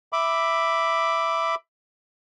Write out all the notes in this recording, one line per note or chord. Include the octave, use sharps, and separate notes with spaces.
E5 B5 D6